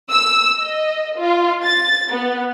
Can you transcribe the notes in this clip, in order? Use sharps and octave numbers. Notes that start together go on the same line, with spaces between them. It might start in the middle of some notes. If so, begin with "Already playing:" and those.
E6
D#5
F4
A6
B3